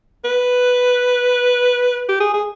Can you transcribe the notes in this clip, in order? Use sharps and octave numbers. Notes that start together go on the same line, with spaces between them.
B4
G4
G#4
G#4